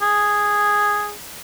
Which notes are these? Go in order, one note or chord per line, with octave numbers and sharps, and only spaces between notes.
G#4